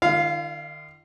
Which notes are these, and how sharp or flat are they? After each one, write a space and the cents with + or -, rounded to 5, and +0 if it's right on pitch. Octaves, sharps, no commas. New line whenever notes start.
D#3 -40 F4 -40 F5 +0